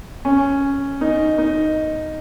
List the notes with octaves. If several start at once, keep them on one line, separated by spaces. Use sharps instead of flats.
C#4
D#4
D#4